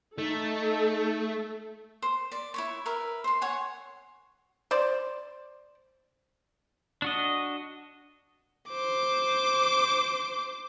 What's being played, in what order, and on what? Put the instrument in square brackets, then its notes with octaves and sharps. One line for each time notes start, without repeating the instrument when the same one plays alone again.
[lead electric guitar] A3 [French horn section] D#4 [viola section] A4
[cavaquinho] C5
D5
E4 C#5 C#6
A#4 B4 E5
C5 C6
C#5 F#5 G#5
[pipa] C5 D5
[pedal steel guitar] D4 F#4 D#5
[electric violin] C5 D6